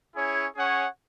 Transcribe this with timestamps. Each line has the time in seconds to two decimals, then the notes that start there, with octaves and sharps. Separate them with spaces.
0.15 C#4 E4 G#4 C#5
0.55 C#4 G#4 C#5 F#5